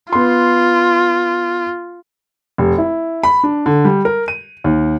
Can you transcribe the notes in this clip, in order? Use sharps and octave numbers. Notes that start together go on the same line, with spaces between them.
B3 F4 C6
F1
E4
B5
D4
D3
G3
A#4
D#7
D#2